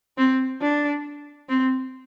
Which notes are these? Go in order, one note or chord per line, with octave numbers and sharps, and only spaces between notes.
C4
D4
C4